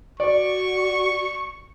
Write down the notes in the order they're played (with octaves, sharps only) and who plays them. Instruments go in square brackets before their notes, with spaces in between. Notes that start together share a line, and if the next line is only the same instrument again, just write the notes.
[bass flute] F#4 [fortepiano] D5 [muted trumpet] C#6